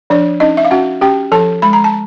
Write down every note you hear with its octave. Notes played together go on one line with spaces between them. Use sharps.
F3 D4 D5
C#4 D#4 D#5
E5
F5
C#4 F#4 F#5
C#4 G4 G5
F3 A4 A5
G#3 B5
A#5
A5